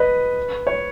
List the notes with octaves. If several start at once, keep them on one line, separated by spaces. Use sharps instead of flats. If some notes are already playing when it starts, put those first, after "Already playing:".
Already playing: B4 D#5
C#5